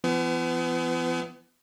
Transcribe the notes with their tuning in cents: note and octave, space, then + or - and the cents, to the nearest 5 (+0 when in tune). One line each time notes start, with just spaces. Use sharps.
F3 -45 B3 +35